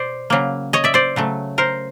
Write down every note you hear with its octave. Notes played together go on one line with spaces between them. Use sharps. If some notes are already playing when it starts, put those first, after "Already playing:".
Already playing: B2 C5 D5
C#3 F#3 A#3
C#5 D#5
D5 E5
C5 D5
C#3 F#3 A3
A#4 C5